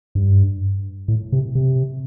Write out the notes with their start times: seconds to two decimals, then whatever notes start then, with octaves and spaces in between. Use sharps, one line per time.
0.15 G2
1.08 A2
1.32 C3
1.55 C3